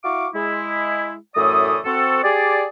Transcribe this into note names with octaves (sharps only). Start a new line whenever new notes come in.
E4 F#4 F5 C#6 D6
G#3 E4
F#2 A2 E3 A3 D5 D#6
C4 F#4 A4
G4 G#4 D5